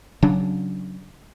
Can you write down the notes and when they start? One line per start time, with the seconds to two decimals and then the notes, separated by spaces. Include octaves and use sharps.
0.23 C#3 F#3 C#4 D4